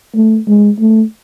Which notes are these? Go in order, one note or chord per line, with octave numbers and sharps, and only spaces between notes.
A3
G#3
A3